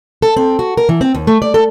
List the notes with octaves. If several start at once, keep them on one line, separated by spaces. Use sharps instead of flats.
A4
C4
F#4
A#4
E3
C4
D#2
A3
D5
A4